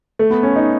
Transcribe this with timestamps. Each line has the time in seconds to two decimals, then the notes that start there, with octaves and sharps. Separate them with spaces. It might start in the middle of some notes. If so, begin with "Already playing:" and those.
0.19 A3
0.30 B3
0.43 C#4
0.56 D#4